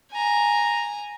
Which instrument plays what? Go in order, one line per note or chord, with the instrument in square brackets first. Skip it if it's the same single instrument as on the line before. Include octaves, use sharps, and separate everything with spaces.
[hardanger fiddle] G#5 A#5